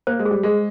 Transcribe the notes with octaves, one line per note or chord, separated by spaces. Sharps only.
A#3 C5
G#3
G#4
G3
G#3 G#4